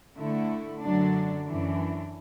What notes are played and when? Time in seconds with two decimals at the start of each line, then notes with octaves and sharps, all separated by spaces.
0.15 D3 A3 E4
0.81 F#2 D3 F#3 D4
1.46 F#2 E3 D4